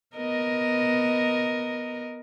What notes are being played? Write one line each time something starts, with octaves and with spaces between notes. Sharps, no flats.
B3 A#4 D#5